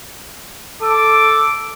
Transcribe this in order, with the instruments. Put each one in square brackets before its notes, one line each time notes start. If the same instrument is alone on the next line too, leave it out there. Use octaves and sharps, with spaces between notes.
[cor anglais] A4 [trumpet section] D6